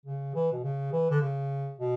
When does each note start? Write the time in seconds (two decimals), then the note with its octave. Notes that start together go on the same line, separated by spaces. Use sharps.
0.06 C#3
0.35 E3
0.53 B2
0.63 C#3
0.93 E3
1.10 D3
1.21 C#3
1.79 B2